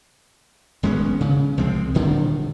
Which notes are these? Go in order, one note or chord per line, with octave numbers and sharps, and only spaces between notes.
G#1 G#3 B3 C#4
C#3
C2 F3 G#3 C4
D#1 D3 D#3